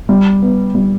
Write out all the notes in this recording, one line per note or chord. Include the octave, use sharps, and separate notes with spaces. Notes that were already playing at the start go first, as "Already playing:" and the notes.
G3
B3
G3